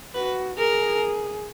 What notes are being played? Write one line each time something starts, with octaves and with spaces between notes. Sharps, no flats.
F#4 B4
G#4 A#4